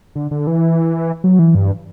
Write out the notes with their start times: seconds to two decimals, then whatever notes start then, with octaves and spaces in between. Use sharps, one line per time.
0.15 D3
0.31 D3
0.47 E3
1.24 F#3
1.39 E3
1.55 G2